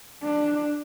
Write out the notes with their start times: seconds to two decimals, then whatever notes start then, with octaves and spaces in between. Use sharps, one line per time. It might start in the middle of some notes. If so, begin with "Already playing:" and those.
0.23 D4